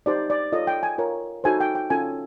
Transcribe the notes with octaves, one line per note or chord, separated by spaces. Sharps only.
D#4 G4 C5 D5
D5
F4 A4 C#5 D#5
G5
G#5
F4 A#4 C#5
D#4 F#4 A4 C5 G#5
G5
G5
C#4 F4 A4 G#5